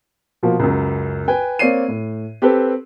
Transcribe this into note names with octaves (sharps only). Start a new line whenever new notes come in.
B2 F3 A#3
C#2 F#2
B4 G5 G#5
A#3 C4 C#5 D5 C7 D#7
A2
C4 G4 A4 B4